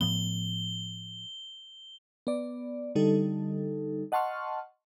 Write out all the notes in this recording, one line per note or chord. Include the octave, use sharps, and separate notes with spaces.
A2 F3 B3 G7
B3 D5
D3 G3 D#4 A4
D#5 F#5 A5 C6 C#6 F6